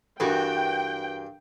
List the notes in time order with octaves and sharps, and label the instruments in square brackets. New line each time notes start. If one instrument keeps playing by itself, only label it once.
[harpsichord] G2 [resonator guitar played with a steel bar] E3 D4 F#4 [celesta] A4 A#4 [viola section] G5